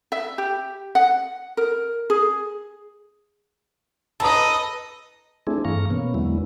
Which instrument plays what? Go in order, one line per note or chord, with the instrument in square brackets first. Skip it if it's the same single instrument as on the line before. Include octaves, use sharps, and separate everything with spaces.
[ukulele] E5
G4
F#5
A#4
G#4
[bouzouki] A4 [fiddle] B4 D#5 [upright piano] A5 A#5 D#6
[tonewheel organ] A3 C4 D4 E4 G#4
G2 E3 A3 F5 A#5 C#6
B2 A#3 B3 C#4
E2 D3 F#3 G#3 B3 E4